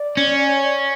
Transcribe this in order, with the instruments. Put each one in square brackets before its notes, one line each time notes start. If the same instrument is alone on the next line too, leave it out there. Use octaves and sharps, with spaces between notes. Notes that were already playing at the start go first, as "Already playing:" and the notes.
Already playing: [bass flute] D5
[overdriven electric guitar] C#4
[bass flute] D5